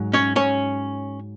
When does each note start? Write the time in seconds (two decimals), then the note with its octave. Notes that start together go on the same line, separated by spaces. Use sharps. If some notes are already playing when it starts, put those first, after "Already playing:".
Already playing: G#2 F#3
0.13 C#4 C#5
0.36 C#4 C#5